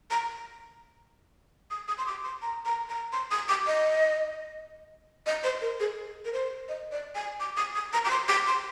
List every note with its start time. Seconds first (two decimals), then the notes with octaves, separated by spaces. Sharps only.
0.11 A#5
1.71 D#6
1.88 D#6
1.98 C6
2.06 D6
2.24 C6
2.42 A#5
2.65 A#5
2.89 A#5
3.12 C6
3.31 D#6
3.48 D6
3.67 D#5
5.26 D#5
5.44 C5
5.61 A#4
5.80 G#4
6.25 A#4
6.33 C5
6.69 D#5
6.92 D5
7.15 G#5
7.40 D6
7.57 D#6
7.75 D#6
7.93 A#5
8.05 D6
8.10 C6
8.28 D6
8.47 C6